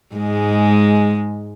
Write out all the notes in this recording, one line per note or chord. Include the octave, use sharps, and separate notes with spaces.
G#2 G#3